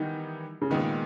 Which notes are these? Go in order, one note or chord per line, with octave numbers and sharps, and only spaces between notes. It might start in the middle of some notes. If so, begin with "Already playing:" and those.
Already playing: D#3 E3 G3 B3 D#4
C#3
A#2 D#3 G#3 B3